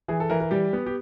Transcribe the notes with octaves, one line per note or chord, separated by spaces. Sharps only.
E3 G#4
A4
E3 A#4
A#4
G3 G4
B3
G4